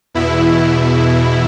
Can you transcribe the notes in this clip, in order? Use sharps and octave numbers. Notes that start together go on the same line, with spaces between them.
E2 B2 E4